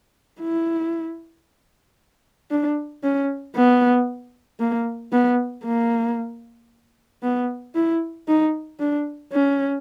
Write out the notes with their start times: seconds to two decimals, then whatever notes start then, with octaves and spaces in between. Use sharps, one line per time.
0.41 E4
2.51 D4
3.03 C#4
3.55 B3
4.60 A#3
5.12 B3
5.65 A#3
7.23 B3
7.75 E4
8.28 D#4
8.80 D4
9.32 C#4